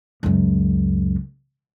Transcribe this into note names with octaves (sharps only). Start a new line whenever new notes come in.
C#2 F#2